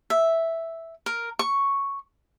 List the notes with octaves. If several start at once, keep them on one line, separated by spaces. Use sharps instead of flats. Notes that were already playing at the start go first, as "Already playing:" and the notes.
E5
A#4
C#6